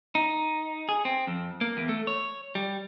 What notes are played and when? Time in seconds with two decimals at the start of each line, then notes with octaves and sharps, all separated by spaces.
0.15 D#4
0.89 G#4
1.05 C4
1.27 F2
1.61 A#3
1.77 E2
1.89 A3
2.07 C#5
2.55 G3